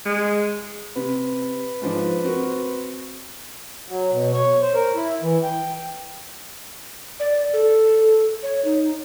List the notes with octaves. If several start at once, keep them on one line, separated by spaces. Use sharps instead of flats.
G#3
C3 B4
G#2 F3 D4
C4 F#4 A#4
F#3
B2
C#5
C5
A#4
E4
E3
G5
D5
A4
C#5
D#4